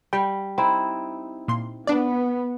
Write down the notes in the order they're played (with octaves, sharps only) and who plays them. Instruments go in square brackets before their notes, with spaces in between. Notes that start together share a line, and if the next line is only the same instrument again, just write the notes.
[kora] G3 [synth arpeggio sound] G5
[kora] C4 D#4 E4
[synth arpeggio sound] A#2 C6
[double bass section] B3 [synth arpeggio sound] D4 D5